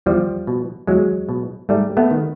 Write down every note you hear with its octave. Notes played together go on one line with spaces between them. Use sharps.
E2 F3 G3
B2
E2 F#3 G#3
B2
G#2 G3 A3
A3 B3
D#3